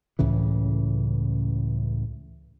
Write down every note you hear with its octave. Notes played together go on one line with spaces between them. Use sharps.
C#2 A2 C#3 E3